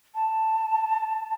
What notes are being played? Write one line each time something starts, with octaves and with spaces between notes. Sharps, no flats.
A5